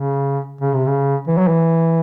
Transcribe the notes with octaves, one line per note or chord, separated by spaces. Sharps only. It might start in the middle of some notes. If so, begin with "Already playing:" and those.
Already playing: C#3
C#3
C3
C#3
E3
F#3
E3